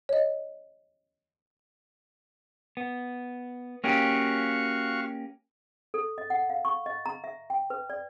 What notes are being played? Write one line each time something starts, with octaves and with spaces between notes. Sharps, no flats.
C#5 D#5
B3
A#3 C#4 F#4 G4 F5 C#6
A4
D#5
F#5
F5
C#6
D#5
A#5
E5
G5
B4
D5